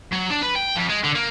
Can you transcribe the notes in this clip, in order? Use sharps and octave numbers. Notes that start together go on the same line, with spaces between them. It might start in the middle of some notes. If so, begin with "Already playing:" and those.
F#3
D4
B4
G5
F2
G#3
D3
A#3